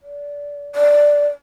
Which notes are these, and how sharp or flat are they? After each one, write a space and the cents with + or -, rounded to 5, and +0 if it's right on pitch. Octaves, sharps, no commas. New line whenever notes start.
D5 -25
D5 -5